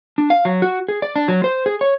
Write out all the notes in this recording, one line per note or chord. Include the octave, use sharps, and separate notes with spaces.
D4
F5
F#3
F#4
G#4
D5
D4
F#3
C5
G#4
C#5